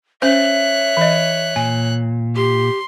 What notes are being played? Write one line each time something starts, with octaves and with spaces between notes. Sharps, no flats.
C#4 C5 C#5 E5 F#6
E3 D#5
A#2 G#5
G4 C6